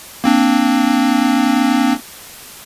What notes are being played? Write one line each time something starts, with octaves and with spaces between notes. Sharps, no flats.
A#3 C4 D4